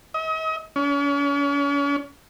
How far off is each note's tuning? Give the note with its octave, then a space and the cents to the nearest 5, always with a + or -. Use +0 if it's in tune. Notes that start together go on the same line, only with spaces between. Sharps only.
D#5 +40
C#4 +40